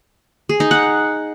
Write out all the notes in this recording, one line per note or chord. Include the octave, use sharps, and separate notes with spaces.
G#4
D#4
F#5